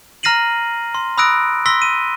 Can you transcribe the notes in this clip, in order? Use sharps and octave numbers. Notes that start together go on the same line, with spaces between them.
A#5 F6 A#6 C7 D#7 F#7
C6
B5 D#6 E6 F#6 A#6 D7
C6 E6 A#6 B6 G7
D#7